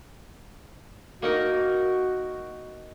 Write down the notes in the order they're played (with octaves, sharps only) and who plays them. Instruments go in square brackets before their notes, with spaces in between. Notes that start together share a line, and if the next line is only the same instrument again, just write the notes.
[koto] A#3 D#4 A#4 [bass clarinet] F#4